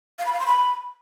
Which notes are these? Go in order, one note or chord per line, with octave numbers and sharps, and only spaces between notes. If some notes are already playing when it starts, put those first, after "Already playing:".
F5
B5
F5
C6
B5